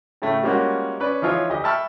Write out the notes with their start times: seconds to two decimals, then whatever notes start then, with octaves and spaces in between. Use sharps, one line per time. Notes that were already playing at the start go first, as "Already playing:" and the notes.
0.22 A2 C#3 A3
0.43 G3 G#3 A#3 C#4 F4 F#4
1.00 C#4 B4 D5
1.22 E3 F3 D#4 F4 G#4 C#5
1.49 D2 G4 D#5
1.64 E5 G5 A5 B5 C#6 F6